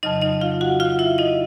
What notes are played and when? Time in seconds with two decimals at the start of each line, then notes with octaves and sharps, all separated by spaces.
0.03 F2 C#3 F#3 D#4 D#5
0.22 D#4 D#5
0.41 F4 F5
0.61 F#4 F#5
0.80 F4 F5
0.99 E4 E5
1.18 D#4 D#5